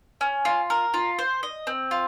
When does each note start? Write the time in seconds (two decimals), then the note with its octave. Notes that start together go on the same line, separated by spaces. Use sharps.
0.21 C#4
0.45 F4
0.70 A#4
0.94 F4
1.19 C5
1.43 D#5
1.67 C4
1.91 F4